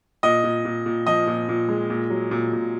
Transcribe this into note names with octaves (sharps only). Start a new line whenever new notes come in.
A#2 D#5
A#2
A#2
A#2
F3 D#5
A#2
A#2
G#3
A#2
F#3
A#2
A#2